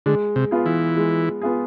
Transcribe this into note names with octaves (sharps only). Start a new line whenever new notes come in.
D3 G#3
C3
B3 F4 G#4
E3
G#3
B3 F4 G#4